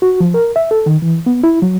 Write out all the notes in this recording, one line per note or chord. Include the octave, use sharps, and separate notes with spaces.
F#4
F3
A#4
E5
A4
D#3
E3
B3
E4
F#3